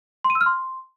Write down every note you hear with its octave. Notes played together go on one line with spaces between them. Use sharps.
C6
D#7
E6
F6
C6